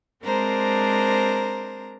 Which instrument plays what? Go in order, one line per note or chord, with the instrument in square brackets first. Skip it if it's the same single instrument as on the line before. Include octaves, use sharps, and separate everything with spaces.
[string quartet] G#3 C4 D4 A#4 C5 A#5